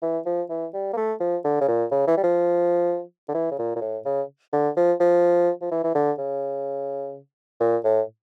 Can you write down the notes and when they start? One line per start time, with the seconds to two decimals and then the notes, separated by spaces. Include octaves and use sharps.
0.02 E3
0.26 F3
0.49 E3
0.74 G3
0.93 A#3
0.97 A3
1.20 F3
1.44 D3
1.61 C#3
1.68 A#2
1.91 C#3
2.07 E3
2.17 G3
2.23 F3
3.29 D3
3.34 E3
3.51 C#3
3.58 A#2
3.76 A#2
3.81 A2
4.05 C#3
4.53 D3
4.76 F3
5.00 F3
5.61 F3
5.71 E3
5.84 E3
5.95 D3
6.18 C#3
7.60 A#2
7.84 A2